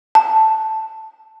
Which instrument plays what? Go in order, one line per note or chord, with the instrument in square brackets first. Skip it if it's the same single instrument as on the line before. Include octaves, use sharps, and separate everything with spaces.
[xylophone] A5